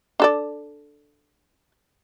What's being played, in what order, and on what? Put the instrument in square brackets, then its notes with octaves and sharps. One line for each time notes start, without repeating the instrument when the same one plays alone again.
[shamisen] D4 A4 D5